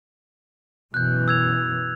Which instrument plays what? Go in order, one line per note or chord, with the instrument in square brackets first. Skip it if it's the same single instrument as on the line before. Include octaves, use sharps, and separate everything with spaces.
[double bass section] F#2 B2 E3 [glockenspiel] F#6 G6
[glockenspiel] E6 G#6 F7